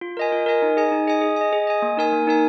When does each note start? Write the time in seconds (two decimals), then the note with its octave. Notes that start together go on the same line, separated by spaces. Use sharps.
0.01 F4
0.17 A#4 D#5 G#5
0.32 F4
0.46 A#4 D#5 G#5
0.62 D#4
0.77 G#4 D#5 G#5
0.92 D#4
1.07 G#4 D#5 G#5
1.21 G#4
1.36 D#5 G#5
1.53 G#4
1.67 D#5 G#5
1.82 A#3
1.97 D#4 A#4 G#5
2.12 A#3
2.27 D#4 A#4 G#5